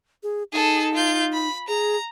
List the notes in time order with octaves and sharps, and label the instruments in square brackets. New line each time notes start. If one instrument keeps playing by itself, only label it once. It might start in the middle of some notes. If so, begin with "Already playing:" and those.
[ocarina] G#4
[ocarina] D#4 [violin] G#4 A4
[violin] F4 G6
B5
[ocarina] G#4 [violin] A#5